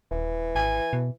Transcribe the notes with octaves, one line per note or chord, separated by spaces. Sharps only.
D#1 E3
G#1 G#5
B2